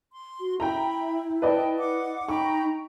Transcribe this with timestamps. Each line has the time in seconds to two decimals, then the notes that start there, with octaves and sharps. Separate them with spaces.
0.11 C6
0.40 F#4
0.60 E4 E5 G5 A#5 B5
1.42 B4 D5 D#5 G5 A5
1.78 F#5 D6
2.29 D#4 G5 A#5 B5 C#6